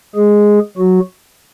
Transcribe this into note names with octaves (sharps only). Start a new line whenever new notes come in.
G#3 G#4
F#3 F#4